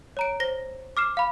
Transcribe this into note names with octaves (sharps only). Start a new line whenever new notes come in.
C#5 A#5 D7
C5 A#6 G7
D6 F6 C7 E7
F5 B5